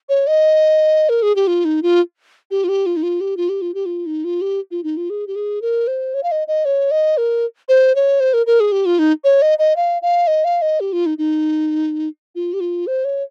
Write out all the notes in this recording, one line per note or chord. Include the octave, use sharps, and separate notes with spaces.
C#5
D#5
A#4
G#4
G4
F4
D#4
F4
G4
F4
G4
F4
D#4
F4
G4
F4
G4
F4
G4
F4
D#4
F4
G4
F4
D#4
F4
G#4
G4
G#4
A#4
C5
C#5
F5
D#5
D#5
C#5
D#5
A#4
C5
C#5
C5
A#4
A#4
G#4
G4
F4
D#4
C#5
D#5
D#5
F5
F5
D#5
F5
D#5
G4
F4
D#4
D#4
F4
G4
F4
C5
C#5